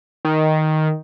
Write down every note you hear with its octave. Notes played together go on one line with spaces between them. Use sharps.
D#3